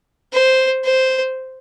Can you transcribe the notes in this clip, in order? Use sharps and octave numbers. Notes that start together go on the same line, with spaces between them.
C5
C5